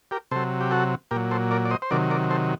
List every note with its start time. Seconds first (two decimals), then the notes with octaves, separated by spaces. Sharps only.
0.11 G4 A#4
0.31 C3 F#3 A4 C5
0.61 G4
0.71 F#4 A4
1.11 A#2 F#3 G4 A#4
1.31 A4 C5
1.51 A#4 D5
1.65 D5
1.71 C5 D#5
1.82 C5
1.91 C3 D#3 F#3 A#4 D5
2.10 A#4 D5
2.31 A4 C5